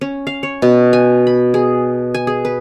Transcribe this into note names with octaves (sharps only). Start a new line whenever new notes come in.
C#4
F5
C#5
B2
G#5
B5
G#4
G#5
G#4
B4